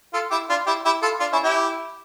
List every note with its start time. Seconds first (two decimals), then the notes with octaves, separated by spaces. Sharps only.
0.13 F4 A4
0.31 E4 G4
0.50 D4 F4
0.67 E4 G4
0.85 E4 G4
1.02 F4 A4
1.20 D4 F4
1.32 C#4 E4
1.44 E4 G4